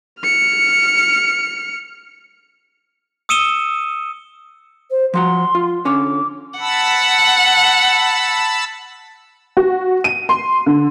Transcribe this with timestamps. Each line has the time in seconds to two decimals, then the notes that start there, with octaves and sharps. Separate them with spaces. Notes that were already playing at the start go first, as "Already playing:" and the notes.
0.20 F6 C#7
3.29 D#6 E6 C#7 D#7 E7 G7
4.90 C5
5.14 F3 F#4 F#5 C6
5.55 F4
5.85 D3 C#4 C#5 D6
6.60 F#5 A5 B5 E6
9.57 F#4
10.04 D#7
10.29 C6
10.66 D3